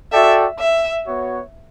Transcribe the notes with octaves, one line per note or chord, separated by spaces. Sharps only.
F#4 A4 D5 E5 G5
E5
B3 F#4 C#5